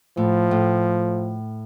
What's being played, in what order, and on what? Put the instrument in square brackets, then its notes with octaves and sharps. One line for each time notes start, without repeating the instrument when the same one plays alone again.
[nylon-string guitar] A2 [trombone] F3
[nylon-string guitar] A2